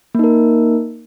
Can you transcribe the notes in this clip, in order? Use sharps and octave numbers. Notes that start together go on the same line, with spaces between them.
A#3 D#4 A#4